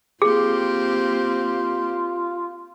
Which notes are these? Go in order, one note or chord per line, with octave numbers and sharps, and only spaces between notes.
A#3 C4 F4 G4 G#4